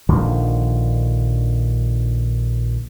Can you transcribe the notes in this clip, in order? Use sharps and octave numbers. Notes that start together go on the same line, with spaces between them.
A#1 D3 D#3 F3